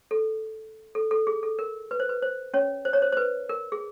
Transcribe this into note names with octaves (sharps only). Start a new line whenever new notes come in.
A4
A4
A4
G#4
A4
A#4
B4
C5
B4
C5
C#4 C#5
C5
C#5
C5
C5
B4
A#4
G#4